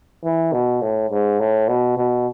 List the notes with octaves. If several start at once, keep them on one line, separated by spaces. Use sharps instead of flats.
E3
B2
A2
G#2
A2
B2
B2